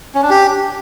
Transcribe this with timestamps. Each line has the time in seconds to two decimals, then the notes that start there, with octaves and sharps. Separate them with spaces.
0.15 C#4
0.23 D4
0.30 G4